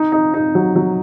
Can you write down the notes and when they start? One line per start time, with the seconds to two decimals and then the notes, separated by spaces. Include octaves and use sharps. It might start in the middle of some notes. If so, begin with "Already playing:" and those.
Already playing: D#4
0.12 D#4
0.34 D#4
0.55 F#3
0.76 F#3